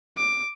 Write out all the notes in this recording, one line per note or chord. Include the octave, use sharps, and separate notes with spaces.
D6